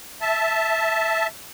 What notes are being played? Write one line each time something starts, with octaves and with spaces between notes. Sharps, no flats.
E5 A5